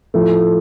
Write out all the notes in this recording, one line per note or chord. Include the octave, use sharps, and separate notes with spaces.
A2 F3 A3